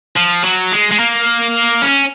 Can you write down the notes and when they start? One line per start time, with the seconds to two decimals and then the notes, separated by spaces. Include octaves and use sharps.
0.17 F3
0.44 F#3
0.72 G#3
0.91 G#3
0.99 A#3
1.82 C#4